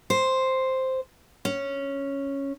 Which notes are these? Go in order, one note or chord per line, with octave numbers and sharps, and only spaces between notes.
C5
C#4